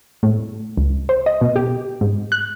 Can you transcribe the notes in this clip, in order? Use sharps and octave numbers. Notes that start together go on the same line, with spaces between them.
A2
C#2
C5
D#5
B2
G4
G#2
F#6